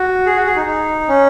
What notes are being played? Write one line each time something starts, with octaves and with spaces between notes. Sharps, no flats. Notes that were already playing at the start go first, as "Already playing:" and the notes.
Already playing: F#4
G#4
F#4
G#4
D#4
D#4
C#4